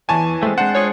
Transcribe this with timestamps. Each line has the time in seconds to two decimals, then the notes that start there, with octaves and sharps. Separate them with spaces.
0.09 E2 E3 C#5 D5 G#5 A5
0.43 G#3 A3 C4 A6
0.58 G#3 D4 C5 F#5
0.74 F4 G#4 C#5